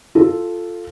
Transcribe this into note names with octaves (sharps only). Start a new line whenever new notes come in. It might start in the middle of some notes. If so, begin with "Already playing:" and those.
F4 A4